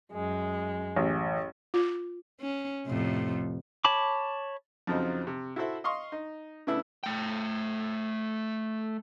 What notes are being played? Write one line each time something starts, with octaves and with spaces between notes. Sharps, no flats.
F#2 G#3
A1
F4
C#4
F2 A2 C3
C#5 A5 B5 D6
F2 C#3 F3 F#3 C4 D#4
C3
E4 F#4 A4 C5 E5
D#5 F5 C6 C#6
D#4
C#3 A3 B3 D4 E4 E5
A3 G5